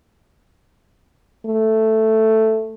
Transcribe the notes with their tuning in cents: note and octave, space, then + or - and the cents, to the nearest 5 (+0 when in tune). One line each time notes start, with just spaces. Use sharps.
A3 +5